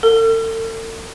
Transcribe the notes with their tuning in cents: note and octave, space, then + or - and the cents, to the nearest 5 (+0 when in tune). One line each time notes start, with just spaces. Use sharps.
A4 +40